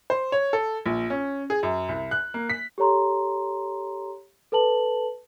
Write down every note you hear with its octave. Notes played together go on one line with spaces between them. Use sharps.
C5
C#5
A4
A#1
C#4
G#4
F#2
C2
F#6
A#3
B6
G4 A4 C#5 A#5 C6
A4 B4 A5 F#7